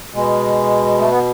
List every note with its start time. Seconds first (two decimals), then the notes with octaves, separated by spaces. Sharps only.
0.14 B2 G#3
0.99 A3
1.09 B3